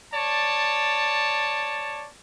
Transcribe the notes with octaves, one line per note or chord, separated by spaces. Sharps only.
C#5 D5 A5